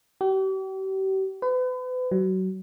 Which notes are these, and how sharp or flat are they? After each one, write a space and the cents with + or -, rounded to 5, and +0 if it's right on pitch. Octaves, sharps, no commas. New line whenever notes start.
G4 -40
B4 +40
F#3 +25